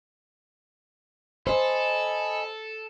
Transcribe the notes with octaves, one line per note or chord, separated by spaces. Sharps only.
A4 C5 D#5 G#5 B5